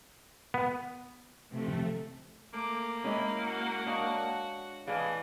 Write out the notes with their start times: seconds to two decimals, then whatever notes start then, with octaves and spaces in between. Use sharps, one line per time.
0.54 B3
1.51 C3 F3 A3
2.54 A3 A#3 D6
3.04 G#3 C#4 E4 D#5 B5
3.44 F#4 F#5
3.86 D4 C#5 D#5 F5
4.87 A2 E3 G#4 D5 D#5 F5